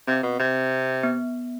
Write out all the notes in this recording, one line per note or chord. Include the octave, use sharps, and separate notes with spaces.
C3 C4
B2
C3
B3